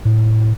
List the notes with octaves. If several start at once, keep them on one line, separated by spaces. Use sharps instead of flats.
A2